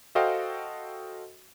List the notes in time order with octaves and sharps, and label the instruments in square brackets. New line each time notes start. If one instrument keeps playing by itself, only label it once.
[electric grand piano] F#4 A4 C5 D#5 F5 G5